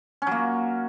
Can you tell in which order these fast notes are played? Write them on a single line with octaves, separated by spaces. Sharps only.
C#4 F#3 A#3